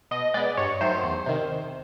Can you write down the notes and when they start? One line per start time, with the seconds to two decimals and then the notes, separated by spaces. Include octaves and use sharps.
0.11 B2 D#5
0.34 G#3 B3 D5
0.57 G2 C#5
0.81 D#3 F#3 A3 C5
1.03 E2
1.26 C3 D#3